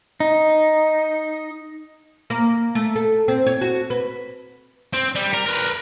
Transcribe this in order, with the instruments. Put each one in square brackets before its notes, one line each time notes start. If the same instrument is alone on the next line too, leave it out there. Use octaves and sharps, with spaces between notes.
[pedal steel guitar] D#4
[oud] A#3
A3
A4
C4
C#5
F#4
B4
[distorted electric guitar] C4
G3
A#4
A#4 B4